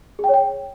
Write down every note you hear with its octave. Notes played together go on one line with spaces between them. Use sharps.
G#4
G5
C#5
G5